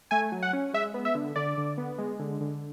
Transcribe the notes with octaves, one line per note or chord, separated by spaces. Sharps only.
A3 G#5
F#3
F#5
C#4
G#3 E5
B3
E5
D3
D3 D5
D3
B3
G#3
D3
D3